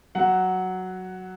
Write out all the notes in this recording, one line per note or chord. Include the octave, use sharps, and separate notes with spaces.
F#3 F#5